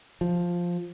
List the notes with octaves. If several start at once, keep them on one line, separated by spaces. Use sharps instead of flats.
F3